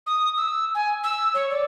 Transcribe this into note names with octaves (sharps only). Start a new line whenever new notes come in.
D#6
E6
G#5
E6
C#5
D5